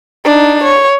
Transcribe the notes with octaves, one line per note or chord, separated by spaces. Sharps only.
D4 D#4
C#5